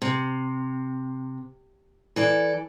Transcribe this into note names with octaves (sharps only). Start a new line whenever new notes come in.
C3
E3 A4 D5